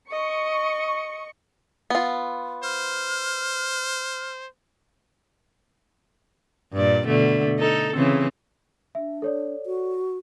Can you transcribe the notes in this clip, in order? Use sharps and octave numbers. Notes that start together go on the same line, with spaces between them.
D#5 C#6 C#7
B3 F4
C5 F6
G2 A#2 D5
B2 D3 A3
D#4 A4
C#3 E3 C4
D4 E5
A4 C#5 D5
F#4